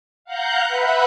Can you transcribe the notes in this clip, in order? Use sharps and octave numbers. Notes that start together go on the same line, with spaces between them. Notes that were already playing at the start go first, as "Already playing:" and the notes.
F5 F#5 A#5 F#6 G6
B4 E5 F#5 B5